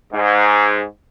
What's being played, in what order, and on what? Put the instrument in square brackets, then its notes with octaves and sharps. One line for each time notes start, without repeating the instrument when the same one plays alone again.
[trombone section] G#2